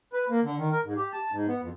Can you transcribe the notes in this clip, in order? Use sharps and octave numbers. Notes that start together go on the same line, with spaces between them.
B4
A#3
D3
D#3
A#4
G#2
G4
A5
G#2
B3
F2